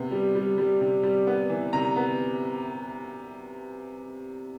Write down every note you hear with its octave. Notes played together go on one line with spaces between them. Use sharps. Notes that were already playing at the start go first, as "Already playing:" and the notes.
Already playing: C3 B3
G3
G3
G3
C3
G3
B3
E3
C3 A#5
B3